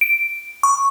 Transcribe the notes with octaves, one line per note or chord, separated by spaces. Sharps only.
D7
C#6